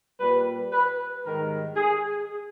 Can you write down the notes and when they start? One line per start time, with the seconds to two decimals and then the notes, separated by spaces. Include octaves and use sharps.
0.20 A#2 G3 B4
0.72 B4
1.24 G#2 D#3 G3 A#4
1.76 G#4